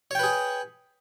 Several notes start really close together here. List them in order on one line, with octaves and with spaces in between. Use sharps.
C#5 G5 B4 G#4